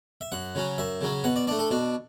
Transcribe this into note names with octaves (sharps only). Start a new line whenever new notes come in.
E5
F#2 F#5
C#3 F#3 C#4
F#2 E5
C#3 F#3 C#4
B2 F#5
D5
A3 D4 D5
A4
B2 D4